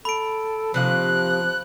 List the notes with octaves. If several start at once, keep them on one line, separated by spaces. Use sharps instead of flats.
A4 B5 D7
C3 D#3 F3 A#3 F#6